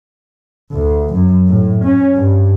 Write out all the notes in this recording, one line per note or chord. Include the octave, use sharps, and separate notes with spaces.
D2
F#2
A2
C#4
G2